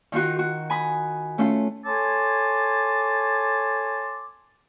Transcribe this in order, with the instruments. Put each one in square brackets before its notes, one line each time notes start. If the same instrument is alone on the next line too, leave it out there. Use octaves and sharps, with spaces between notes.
[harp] D#3 D#4 F4 F#4
F#4
G#5 B5 D#6
A3 C#4 F4
[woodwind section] A4 C#5 G#5 A5 C6 D6